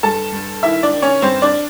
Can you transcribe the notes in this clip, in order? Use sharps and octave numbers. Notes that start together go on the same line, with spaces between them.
G2 A4 A5
G2
D#3 E4 E5
D4 D5
D#3
C#4 C#5
G2 C4 C5
D4 D5